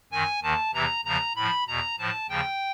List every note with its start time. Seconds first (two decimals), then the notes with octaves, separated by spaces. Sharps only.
0.12 F#2 D#3 G#5
0.43 D#2 D#3 A5
0.74 E2 C3 E3 A#5
1.05 E2 C#3 F3 A#5
1.36 A2 F3 B5
1.68 E2 B2 A#5
1.99 A2 F3 A5
2.29 D#2 C#3 F3 G5